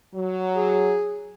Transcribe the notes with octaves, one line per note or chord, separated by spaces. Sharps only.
F#3
G#4